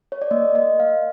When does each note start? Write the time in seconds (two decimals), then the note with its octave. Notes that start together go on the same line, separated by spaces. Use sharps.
0.12 C#5
0.22 D5
0.31 A#3 D#5
0.55 A#3 D#5
0.80 A#3 F5